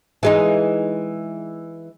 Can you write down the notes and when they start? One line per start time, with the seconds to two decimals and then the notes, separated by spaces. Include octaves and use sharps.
0.23 E3 G#3 D#4